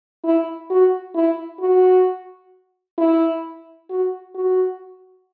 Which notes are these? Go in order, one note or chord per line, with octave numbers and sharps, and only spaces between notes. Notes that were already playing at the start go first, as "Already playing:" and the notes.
E4
F#4
E4
F#4
E4
F#4
F#4